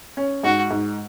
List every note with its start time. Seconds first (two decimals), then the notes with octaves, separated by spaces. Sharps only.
0.17 C#4
0.43 G#2 F#4
0.71 G#2